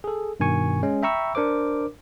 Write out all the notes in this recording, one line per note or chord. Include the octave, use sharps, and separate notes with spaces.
G#4 A4
G2 B2 D#3 G#5 C#6
G#3 C#4
E5 G5 A#5 B5 C#6 E6
D4 A#4 C5 D6